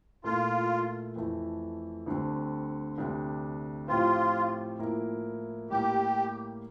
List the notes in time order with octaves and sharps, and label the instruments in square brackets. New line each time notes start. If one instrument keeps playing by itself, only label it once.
[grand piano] A#2 A3 E4 A4 [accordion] F4
[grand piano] F2 E3 A3 E4
D2 D3 G3 C4
D2 C3 G3 D4
[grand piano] A2 F3 C4 G4 C5 [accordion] F4
[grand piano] A2 F3 A#3 E4 A#4
[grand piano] A2 G3 A#3 [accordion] G4